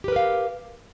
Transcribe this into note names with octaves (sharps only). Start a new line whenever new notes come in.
G4 A#4 B4 F5